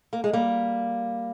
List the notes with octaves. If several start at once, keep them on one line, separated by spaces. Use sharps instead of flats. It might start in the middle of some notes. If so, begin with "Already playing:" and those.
A#3
G#3
G3 A#3